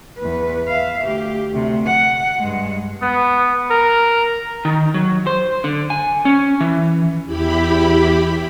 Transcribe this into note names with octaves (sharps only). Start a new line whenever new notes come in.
E2 B4
E5 F5
D2 G4
D2 C3
F#5
G2 G#3
B3
A#4
D#3
F#3
C5
D3
G#5
C#4
E3
E2 E4 G4 B5